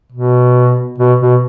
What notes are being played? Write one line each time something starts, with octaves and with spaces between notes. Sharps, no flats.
B2
B2
B2